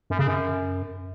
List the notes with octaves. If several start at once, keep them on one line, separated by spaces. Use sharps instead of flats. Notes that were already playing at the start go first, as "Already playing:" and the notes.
F#2
C#3
F#2